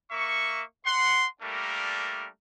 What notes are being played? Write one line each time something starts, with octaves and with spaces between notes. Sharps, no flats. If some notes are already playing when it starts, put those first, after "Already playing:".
A#3 E5 C#6
F#5 C6
G3 A3 A#3 D4 A#4